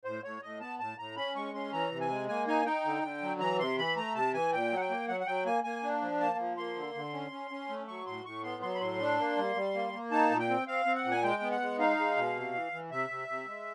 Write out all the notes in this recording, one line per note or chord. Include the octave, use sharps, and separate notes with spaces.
A2 C5
A2 C#5
A2 D#5
B3 A5
A2 A5
A2 A#5
C#4 B5
G#3 C#6
C#4 C6
E3 A#5
C3
G#5
G#3
A#3 G#5
D#4 G#5
D#4 G5
D3
D3
F#3
E3 A#5
C3 C6
E3 B5
A3 A#5
C3 A5
E3 G#5
A#2 G5
F#3 F#5
G5
A#3
F#3 F#5
F#5
F#3 G5
A#3 G#5
A#3 G#5
D4
F3
A#3 A5
F3
A#3 C6
D3
D3
C#4
C#4
C#4
A3
F#3 C#6
A2 C6
A2 C#6
B3 C6
F#3 C6
B5
A2 C6
D4
A#3
G3
G3
A#3
A#3
D#4 A5
A#2
G5
C4
C4 F5
C4
F#5
A#2
G#5
G#3 G5
B3
F#5
G#3
D#4 F5
G#3
B2
C3
E3
E3
C3 E5
C3
C3
G#3